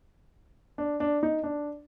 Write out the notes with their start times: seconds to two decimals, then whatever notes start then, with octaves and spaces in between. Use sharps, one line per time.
0.78 D4
1.00 D4
1.23 D#4
1.43 D4